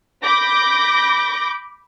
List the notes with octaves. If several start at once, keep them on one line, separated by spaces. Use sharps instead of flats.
B5 D6 G6 A#6